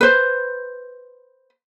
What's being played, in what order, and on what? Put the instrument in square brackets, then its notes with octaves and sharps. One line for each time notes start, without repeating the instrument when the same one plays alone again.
[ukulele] B4 C5